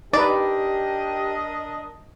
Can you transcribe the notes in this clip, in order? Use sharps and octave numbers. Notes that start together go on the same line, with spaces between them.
D4 D#4 G4 A#4 B4 D5 D#5